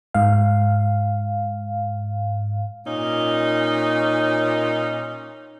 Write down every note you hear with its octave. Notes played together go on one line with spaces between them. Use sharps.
G#2 F5
A#2 C#4 D#4